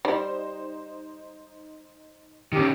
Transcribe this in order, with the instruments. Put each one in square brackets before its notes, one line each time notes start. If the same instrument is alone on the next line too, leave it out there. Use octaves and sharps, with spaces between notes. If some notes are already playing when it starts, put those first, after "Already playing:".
[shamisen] G3 [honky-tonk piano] D#4 C5
[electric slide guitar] D#3 C#4 [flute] G4